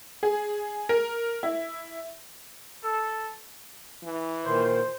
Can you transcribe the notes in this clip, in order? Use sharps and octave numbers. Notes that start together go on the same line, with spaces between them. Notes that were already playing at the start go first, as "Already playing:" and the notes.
G#4
A#4
E4
A4
E3
A#2 D#3 C5